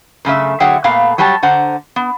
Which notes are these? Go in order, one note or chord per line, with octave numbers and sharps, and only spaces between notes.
F#2 C#3 A3 E5
D3 F#3 G#4 E5 F#5 G5
A#2 A3 B3 F5
F#3 G3 F#4 G4 A#4 A5
D3 C5 F#5 A#5
B3